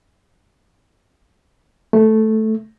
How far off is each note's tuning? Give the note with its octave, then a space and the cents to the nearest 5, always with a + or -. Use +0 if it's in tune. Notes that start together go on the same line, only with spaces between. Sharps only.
A3 -5